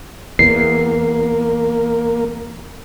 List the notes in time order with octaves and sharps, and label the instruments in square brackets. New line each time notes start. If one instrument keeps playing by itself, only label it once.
[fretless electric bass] E2 [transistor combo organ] A#3 [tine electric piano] C7